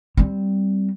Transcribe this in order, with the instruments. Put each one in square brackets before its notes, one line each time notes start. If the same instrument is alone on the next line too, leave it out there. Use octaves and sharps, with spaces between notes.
[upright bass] G3 C4